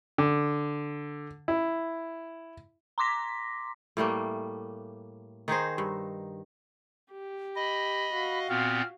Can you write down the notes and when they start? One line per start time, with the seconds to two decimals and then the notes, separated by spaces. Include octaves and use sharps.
0.18 D3
1.48 E4
2.98 A#5 C6 D6 A#6 B6
3.97 A2 G3 A3 A#3
5.48 D#3 D#4 G#4 C5
5.78 G2
7.11 G4
7.56 D#5 B5
8.12 F#4 F5
8.49 A#2 B3 C4 F6